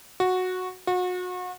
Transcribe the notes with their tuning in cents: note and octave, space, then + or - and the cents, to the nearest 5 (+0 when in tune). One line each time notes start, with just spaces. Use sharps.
F#4 -10
F#4 -35